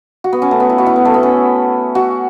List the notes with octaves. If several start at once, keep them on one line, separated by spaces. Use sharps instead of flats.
F#4
B3
C#4
A3
B3
E4
F#4
E4
B3
A3
B3
C#4
F#4